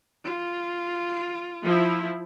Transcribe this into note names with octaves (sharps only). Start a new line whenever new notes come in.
F4
F3 E4